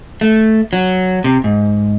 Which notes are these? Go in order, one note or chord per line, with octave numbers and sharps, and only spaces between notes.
A3
F#3
C3
G#2